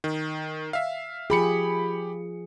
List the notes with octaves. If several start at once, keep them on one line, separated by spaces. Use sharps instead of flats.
D#3
E5 F5
F3 F4 G4 G#4 B5 C#7